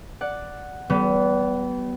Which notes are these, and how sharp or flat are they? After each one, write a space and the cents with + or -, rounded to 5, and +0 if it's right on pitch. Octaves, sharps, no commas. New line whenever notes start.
D5 +0 F#5 +0
G3 -40 B3 +0